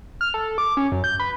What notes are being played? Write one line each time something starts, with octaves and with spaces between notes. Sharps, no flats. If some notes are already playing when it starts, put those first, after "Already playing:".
F6
A4
D6
C#4
F#2
G6
B4